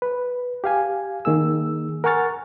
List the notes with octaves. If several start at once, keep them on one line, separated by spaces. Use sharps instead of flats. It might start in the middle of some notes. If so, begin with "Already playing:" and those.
B4
G4 F5 G#5
D#3 A#3 G#4 E6
A#4 F#5 G#5 C#6 F6 A6